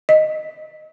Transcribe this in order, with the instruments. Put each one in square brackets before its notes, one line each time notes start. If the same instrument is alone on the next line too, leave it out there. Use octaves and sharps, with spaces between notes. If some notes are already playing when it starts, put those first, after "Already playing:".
[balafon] D#5